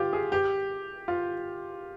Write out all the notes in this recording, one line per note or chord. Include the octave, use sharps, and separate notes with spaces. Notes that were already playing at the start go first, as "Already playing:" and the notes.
Already playing: F4 G4
G#4
G4
F4